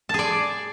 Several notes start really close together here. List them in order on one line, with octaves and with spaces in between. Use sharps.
A5 G#4 D5